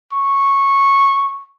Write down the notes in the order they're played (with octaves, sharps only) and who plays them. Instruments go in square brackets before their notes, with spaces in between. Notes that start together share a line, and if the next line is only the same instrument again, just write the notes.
[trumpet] C#6